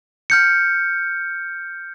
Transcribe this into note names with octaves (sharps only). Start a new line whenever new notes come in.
F6 G6 C#7